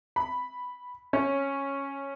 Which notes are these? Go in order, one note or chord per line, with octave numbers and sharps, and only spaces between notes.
B5
C#4